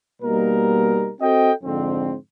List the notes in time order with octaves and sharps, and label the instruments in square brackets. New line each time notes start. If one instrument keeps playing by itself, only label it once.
[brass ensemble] B2 G3 A#3 D#4 A#4
C4 F#4 A4 D#5 G5
F2 G#2 D3 C4